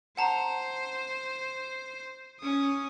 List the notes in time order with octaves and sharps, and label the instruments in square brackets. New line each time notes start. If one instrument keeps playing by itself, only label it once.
[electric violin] C5 [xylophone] F#5 A5 A#5
[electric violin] C#4 D#6